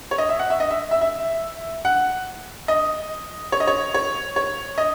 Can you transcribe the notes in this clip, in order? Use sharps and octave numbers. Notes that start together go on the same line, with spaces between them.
C#5
D#5
E5
F#5
E5
D#5
E5
E5
E5
F#5
D#5
C#5
D#5
C#5
C#5
C#5
D#5